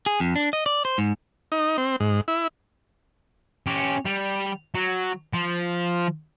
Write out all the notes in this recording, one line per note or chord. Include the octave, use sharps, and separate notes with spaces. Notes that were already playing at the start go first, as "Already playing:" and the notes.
G#4
F2
D4
D#5
D5
C5
G#2
D#4
C4
G#2
E4
C#4 G4
G3
F#3
F3